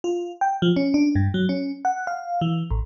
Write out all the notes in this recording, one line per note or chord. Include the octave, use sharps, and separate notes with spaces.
F4
G5
F3
C#4
D4
G2
F#3
C#4
F#5
F5
E3
A1